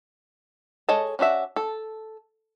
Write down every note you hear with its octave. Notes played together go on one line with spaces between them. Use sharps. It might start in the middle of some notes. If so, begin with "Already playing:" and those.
G#3 A4 C#5 D#5 A5
C#4 D4 F#4 E5
A4